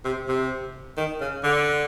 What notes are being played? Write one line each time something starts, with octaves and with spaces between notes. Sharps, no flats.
C3
C3
D#3
C#3
D3